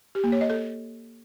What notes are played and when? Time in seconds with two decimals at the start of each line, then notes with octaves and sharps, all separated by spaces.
0.15 G4
0.24 A#3
0.32 C#5
0.41 D#5
0.50 A4